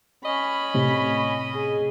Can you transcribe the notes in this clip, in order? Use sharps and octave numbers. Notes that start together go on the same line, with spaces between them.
C#4 D#5 B5
A2 C3
G#4